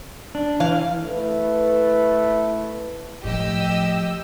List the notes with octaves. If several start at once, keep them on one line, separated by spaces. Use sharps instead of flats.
D4
E3 F5
A3 E4 B4
A2 F3 G4 D#5 E6